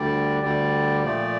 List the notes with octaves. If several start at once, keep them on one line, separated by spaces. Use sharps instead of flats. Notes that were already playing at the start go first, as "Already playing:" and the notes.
Already playing: D2 D3 G3 D5
D2 D3 G3 D5
A#2 F3 A3 D5